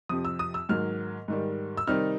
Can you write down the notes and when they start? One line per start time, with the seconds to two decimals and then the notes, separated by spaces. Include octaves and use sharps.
0.09 F2 C3 F3 D#6
0.25 E6
0.39 D#6
0.54 E6
0.69 G#2 D#3 F#3 A#3 F6
1.28 G#2 D#3 G3
1.77 E6
1.87 C3 D#3 G3 C4 D#4 F6